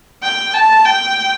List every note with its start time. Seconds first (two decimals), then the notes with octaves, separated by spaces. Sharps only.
0.22 G5
0.53 A5
0.85 G5